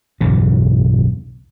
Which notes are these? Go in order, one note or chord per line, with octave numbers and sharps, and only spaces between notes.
B1 E2 G2 C#3